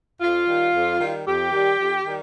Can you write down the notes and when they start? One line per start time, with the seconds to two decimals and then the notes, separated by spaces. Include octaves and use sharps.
0.21 F2 F4
0.48 D#3 G3
0.75 F2
1.01 D#3 G3
1.27 F2 G4
1.52 D#3 G3
1.78 F2
2.06 D#3 G3